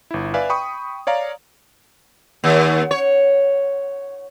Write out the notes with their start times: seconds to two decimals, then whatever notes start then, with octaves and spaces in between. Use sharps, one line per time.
0.11 G1 E4
0.34 B4 D5 E5 F5 G#5
0.49 G5 B5 C#6 D#6
1.07 C#5 D5 F5 A#5
2.44 D#2
2.91 C#5